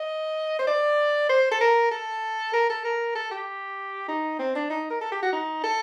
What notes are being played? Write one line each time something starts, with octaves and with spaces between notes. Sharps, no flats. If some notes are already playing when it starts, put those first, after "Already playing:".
Already playing: D#5
C5
D5
C5
A4
A#4
A4
A#4
A4
A#4
A4
G4
D#4
C4
D4
D#4
A#4
A4
G4
F#4
D#4
A4